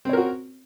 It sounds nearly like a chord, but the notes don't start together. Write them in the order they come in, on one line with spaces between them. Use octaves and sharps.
C4 C#5 A#4 F#4